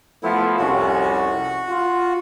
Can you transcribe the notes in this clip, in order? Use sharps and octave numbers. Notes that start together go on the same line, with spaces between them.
F3 A3 B3 E4
C2 F2 C#4 F#4
F4